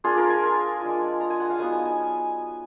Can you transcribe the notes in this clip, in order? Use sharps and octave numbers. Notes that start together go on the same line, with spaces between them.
A#3 D4 F4 G#4
A#4
G#5
G#3 D4 F4
A#5
G#5
F#5
F5
F#3 B3 D#4 G#5
G#5
G#5